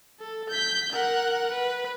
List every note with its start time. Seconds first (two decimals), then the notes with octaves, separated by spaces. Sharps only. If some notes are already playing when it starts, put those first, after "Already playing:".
0.20 A4
0.49 G6 B6
0.91 A#4 F#5
1.50 B4